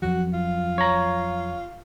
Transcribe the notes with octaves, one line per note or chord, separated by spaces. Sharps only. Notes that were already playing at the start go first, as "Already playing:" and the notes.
F2 F3 F#3 F#4
F4
C#5 A#5